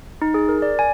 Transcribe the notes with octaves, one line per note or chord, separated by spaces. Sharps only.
D#4
G#4
A#4
D5
G#5